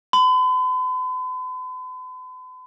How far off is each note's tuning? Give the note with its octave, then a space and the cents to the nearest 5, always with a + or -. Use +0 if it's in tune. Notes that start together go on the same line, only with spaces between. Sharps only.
B5 +45